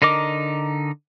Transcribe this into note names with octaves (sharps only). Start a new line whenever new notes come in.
D3 D#4 A#4 D#5 D6